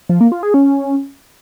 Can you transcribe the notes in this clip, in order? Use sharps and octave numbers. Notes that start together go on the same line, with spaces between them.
F3
A#3
F4
G#4
C#4